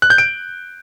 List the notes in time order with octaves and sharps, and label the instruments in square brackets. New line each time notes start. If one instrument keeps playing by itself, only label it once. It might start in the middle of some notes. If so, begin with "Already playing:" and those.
[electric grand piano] F#6
G6
D7